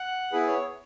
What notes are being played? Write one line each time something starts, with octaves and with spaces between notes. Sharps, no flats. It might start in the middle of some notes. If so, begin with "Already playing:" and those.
Already playing: F#5
B3 E4 G#4 B4
C#5